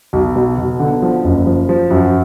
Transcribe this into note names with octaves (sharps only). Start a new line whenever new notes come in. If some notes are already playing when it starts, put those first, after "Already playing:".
B1
B2
B1
D3
F3
F#1
F3
F3
F#2